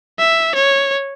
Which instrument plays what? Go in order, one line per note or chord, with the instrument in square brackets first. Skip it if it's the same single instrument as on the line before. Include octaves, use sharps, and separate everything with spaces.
[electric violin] E5
C#5